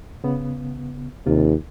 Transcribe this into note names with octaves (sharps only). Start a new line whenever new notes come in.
C#3 B3
D#2 C3 F4